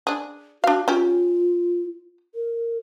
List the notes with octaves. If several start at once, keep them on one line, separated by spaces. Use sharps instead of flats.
D4 G#4
D4 F#4 F5
C#4 F4 G4
A#4